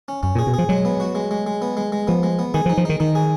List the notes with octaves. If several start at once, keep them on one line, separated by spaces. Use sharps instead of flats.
C#4
F#2 C#4
A#2
G#4
B2
F3 G#4
F#3 G#3
B3
F#4
G#3
G#3
G#3
B3
G#3
G#3
F3 B3
G#3
B3
D#3 G#4
F3
D#4
F3
D#3 D#4
D#3 D#4
G#4